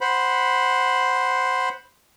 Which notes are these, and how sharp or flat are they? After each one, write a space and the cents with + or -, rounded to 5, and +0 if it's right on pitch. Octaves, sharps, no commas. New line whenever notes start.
C5 +0 F#5 +0 B5 +0